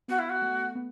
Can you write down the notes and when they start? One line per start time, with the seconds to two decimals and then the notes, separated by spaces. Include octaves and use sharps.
0.08 B3 F#4
0.18 E4
0.29 F#4
0.42 A3
0.75 B3